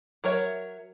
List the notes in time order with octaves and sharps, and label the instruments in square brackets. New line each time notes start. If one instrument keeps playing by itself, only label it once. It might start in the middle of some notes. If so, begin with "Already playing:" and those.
[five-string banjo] F#3 A#4 C#5 E5